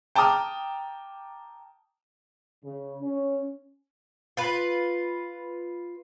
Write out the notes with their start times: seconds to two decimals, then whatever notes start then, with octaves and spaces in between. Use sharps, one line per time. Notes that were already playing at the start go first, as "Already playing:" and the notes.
0.15 G5 A5 A#5 D6 D#6 F6
2.64 C#3
3.01 C#4
4.37 F4 B4